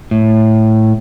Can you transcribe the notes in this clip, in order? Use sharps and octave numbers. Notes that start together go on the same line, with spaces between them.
A2